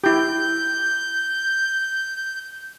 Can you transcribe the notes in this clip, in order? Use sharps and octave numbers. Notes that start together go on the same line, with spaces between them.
E4 G4 G6